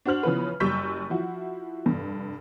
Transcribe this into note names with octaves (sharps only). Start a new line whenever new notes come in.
D4 F#4 C5 F6 F#7
C#3 E3 F3 B3 F4 B4
F#1 G3 C#6 E6 G6 B6
F3 E4 F#4
F1 G2